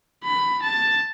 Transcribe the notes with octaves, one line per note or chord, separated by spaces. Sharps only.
B5
A5